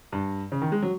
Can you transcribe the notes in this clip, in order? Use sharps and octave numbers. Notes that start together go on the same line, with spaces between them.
G2
C#3
D#3
G#3
F#3